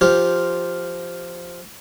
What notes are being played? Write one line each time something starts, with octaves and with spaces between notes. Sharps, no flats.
F3 F4 G4